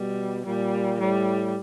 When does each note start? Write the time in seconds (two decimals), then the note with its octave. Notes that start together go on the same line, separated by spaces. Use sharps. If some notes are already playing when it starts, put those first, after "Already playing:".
Already playing: B2 G3
0.46 A#2 G3
1.00 A2 G3